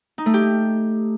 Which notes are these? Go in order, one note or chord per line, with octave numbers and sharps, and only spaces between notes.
D#4
A3
G4